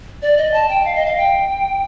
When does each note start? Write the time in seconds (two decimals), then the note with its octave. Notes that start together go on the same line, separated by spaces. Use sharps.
0.22 D5
0.38 D#5
0.54 A5
0.69 G5
0.85 F5
0.95 D#5
1.06 F5
1.17 G5